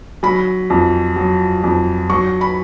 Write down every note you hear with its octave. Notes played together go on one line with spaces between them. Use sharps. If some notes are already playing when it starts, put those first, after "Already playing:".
F#3 B5
F2
F#3
F2
F#3 C#6
B5